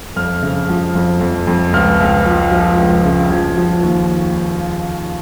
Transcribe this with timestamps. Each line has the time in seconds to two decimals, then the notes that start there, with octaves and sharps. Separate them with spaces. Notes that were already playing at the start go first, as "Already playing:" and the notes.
0.16 F2 F6
0.42 C#3
0.69 F3
0.95 F2
1.21 F2
1.47 F2
1.73 C#2 F6
2.00 C#2
2.25 F3
2.52 F3
2.78 C#2
3.05 C#3
3.30 F3 G#6
3.57 F3
3.83 D#2